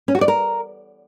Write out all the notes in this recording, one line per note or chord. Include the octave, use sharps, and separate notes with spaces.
C#4
F#4
D5
A#4